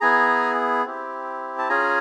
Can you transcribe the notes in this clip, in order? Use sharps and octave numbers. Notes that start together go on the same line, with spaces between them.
B3 E4 G#4 G#5 A#5
C4 E4 G4
A5
C#4 F4 G#4 G#5 A#5